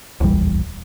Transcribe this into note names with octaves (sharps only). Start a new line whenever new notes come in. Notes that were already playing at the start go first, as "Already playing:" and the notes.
D1 A#1 E2 G3